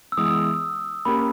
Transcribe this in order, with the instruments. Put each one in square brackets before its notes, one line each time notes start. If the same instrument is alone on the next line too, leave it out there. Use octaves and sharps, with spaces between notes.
[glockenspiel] E6
[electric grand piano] E3 G#3 B3 [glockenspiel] D#6
[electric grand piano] A#3 C#4 G4 A#4 [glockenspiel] B5